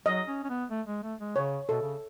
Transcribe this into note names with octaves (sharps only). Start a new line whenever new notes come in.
F#3 D#5
C#4
C#4
B3
A3
G#3
A3
G#3
C#3 C#5
B2 A4
C#3